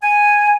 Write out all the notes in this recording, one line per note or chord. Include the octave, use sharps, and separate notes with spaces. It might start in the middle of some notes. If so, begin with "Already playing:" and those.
G#5